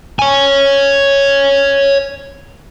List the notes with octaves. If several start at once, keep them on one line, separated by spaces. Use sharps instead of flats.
C#5 G#5